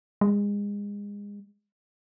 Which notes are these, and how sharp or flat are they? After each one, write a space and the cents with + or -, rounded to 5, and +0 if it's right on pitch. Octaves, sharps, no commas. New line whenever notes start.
G#3 -30